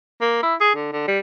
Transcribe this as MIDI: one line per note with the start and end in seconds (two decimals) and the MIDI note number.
0.21 0.40 58
0.43 0.55 64
0.61 0.73 68
0.75 0.92 50
0.93 1.04 50
1.08 1.19 55